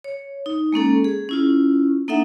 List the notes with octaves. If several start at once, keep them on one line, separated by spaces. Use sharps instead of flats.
C#5
D#4
G#3 A#3 C#4 A4
G#4
C#4 E4 F4
A#3 D4 D#4 A4 E5 F#5